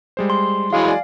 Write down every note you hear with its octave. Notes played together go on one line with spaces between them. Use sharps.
G3 G#3 C5
C6
E3 F#3 G#3 F5
D5 G#5